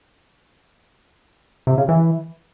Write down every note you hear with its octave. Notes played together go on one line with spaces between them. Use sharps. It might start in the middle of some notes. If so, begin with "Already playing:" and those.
C3
C#3
E3